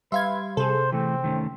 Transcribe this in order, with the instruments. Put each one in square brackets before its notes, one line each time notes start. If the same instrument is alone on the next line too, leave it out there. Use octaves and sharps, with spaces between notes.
[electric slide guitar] G3 [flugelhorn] B4 [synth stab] E5 F5 G#6 [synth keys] C6
[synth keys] C3 [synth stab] G#4 A4 [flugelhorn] C5
[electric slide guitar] E3 A3 [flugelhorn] C4
[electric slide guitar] D#3 A3 C#4